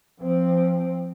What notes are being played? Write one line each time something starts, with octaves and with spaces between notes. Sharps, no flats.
F3 C4